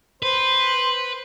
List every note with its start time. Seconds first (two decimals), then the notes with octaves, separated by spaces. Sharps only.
0.22 B4 C5